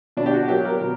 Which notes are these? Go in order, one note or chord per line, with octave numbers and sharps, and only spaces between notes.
B2 D4
G4
F#4
F#3 A#3 G4
A#4
B2